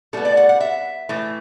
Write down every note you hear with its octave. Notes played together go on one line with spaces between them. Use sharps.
A2 G3 B3 A4
D5
F#5
F#5
E5
A2 E3 A3